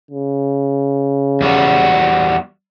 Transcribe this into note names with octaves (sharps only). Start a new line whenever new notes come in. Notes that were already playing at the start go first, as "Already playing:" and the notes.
C#3
E2 G3 F#4